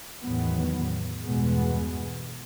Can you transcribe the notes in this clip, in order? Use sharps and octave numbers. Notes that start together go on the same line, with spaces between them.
E2 A2 D#3 F#3 B3
E2 G2 B2 G#3 B3